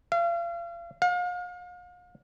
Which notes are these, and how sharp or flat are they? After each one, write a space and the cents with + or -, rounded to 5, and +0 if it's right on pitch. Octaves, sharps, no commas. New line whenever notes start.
F5 -35
F5 +40